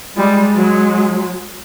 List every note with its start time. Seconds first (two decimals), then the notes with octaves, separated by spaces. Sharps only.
0.17 G3 G#3
0.55 F#3